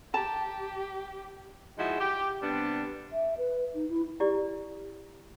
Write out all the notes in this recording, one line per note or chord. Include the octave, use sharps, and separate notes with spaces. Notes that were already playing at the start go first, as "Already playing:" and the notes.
G4 A5 A#5
F3 G#3 D#4 E4 F#4
G4
C3 G3 B3 D4
E5
B4
D#4
E4
E4 G4 D5